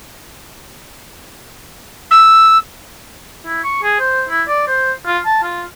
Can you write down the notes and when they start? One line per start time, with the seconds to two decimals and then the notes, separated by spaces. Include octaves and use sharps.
2.10 E6
3.45 E4
3.63 C#6
3.83 G#4
3.99 C5
4.29 E4
4.48 D5
4.67 C5
5.06 F4
5.25 A5
5.43 F4